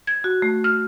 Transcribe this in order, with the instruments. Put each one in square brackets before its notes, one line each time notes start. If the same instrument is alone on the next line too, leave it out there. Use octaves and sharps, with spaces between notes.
[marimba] G#6
F#4
A3
F6